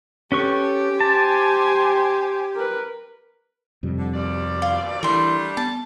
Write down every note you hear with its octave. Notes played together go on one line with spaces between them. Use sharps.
C#4 G4 A4 B4 C#6
C5 G#5 A5
A#4 B4
F2 C3 G3
D3
D#2 B2 D5
F4
E3 G3 A3 D4 A#4 C6
B3 A5